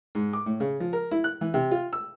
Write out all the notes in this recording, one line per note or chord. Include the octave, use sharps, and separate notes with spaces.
G#2
D6
A2
C#3
F3
A#4
E4
F#6
E3
C3
F4
E6